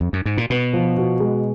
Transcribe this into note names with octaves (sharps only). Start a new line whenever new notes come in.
F2
F#2
G#2
A#2
B2 B3
F3
F#4
G#3